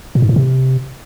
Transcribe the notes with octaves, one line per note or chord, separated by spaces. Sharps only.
A#2
G#2
A2
C3